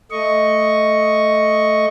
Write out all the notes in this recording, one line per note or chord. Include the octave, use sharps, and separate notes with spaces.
A3 D#5 C#6